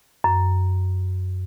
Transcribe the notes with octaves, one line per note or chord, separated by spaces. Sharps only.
F#2